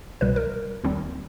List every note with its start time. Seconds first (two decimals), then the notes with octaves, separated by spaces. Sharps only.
0.21 C2 B2 G3 B4
0.36 A#4
0.84 D#2 D#3 G3 C4